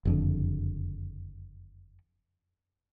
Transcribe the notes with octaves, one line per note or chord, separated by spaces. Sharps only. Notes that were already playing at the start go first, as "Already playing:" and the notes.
F#1 F2 D3